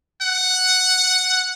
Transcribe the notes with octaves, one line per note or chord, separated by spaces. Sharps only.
F#5